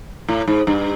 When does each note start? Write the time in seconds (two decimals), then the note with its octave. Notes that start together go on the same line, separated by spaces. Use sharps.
0.28 A2
0.48 G#2
0.67 G2